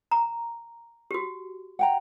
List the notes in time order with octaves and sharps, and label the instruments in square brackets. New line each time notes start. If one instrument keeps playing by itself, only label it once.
[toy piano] A#5
F#4 G4
[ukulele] F#5 G5 A#5